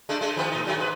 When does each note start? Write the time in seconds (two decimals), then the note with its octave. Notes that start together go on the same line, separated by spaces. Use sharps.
0.09 G#3 A3 D4
0.21 G#3 A3
0.36 D#3 F3 B3
0.51 A2 D#4
0.65 D#3 F#3 A3
0.77 G#2 B4